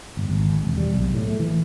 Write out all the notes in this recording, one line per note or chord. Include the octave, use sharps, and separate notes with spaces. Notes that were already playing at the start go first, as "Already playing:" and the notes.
G1
G#1
E1
G3
B1
A2
A3
E3